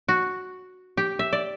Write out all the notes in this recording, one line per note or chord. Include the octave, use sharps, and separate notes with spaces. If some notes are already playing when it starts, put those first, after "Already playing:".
F#4
G4
E5
D5